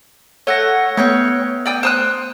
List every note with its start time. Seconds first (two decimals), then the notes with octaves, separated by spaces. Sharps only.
0.47 A3 C#5 F#5 A#6
0.97 A3 B3 C#5 G5 F#6
1.66 D5 G5 D#6
1.83 C5 D#6 F#6